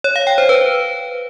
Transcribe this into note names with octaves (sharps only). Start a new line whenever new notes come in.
C#5
F5
G5
C5
B4